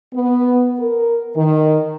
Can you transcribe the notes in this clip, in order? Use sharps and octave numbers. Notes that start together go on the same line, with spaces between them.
B3
A#4
D#3